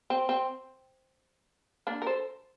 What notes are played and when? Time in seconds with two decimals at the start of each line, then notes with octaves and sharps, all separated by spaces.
0.10 C4
0.29 C4
1.87 A#3 D4
2.02 A#4
2.06 A4 C5